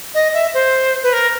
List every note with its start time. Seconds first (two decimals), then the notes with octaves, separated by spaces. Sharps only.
0.14 D#5
0.33 E5
0.53 C5
1.02 B4
1.12 A#4